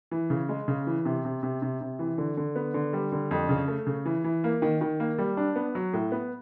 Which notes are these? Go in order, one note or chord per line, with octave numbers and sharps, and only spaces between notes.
E3
C#3
G#3
C#3
E3
C3
C3
C3
C3
C3
E3
D3
D3
B3
D3
G3
D3
F2
C#3
A3
C#3
E3
E3
A#3
D#3
D#3
A#3
G3
D4
B3
F#3
A2
B3